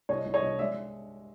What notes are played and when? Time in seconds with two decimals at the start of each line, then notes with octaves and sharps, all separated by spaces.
0.09 C2 C#5 D#5
0.26 C2
0.34 C#5 D#5
0.43 C2
0.59 G#3 D5 E5